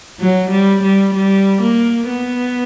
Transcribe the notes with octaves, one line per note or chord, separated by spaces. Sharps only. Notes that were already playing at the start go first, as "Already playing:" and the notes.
F#3
G3
G3
G3
A#3
B3